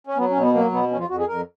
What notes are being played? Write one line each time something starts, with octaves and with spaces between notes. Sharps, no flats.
C#4
F#3 B3
C#4
B2
B3
F#3 A#3
B2 B3
F2 C#4
F4
F2 F#4
G#4
F2 A#4